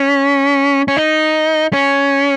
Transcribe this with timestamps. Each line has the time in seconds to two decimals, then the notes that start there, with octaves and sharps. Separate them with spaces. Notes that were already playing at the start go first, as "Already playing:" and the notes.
Already playing: C#4
0.88 C#4
0.97 D#4
1.73 C#4